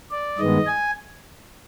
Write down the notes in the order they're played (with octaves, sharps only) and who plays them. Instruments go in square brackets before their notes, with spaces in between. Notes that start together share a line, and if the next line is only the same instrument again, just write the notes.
[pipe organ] D5
G2 D#3 G#3 B3 D#5
G#5